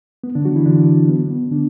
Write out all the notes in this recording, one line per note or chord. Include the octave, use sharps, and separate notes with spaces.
B3
D3 D4
F#3 F#4
E3 E4
D3 D4
B3
B3
D3 D4